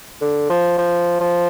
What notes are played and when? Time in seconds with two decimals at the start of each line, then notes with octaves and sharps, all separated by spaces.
0.21 D3
0.50 F3
0.78 F3
1.21 F3